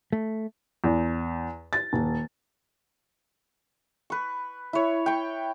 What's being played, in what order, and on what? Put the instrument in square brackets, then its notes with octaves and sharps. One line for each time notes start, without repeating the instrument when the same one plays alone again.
[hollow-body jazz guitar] A3
[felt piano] E2
A6
D#1
[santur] B4 C#6
E4 C#5
G5 C#6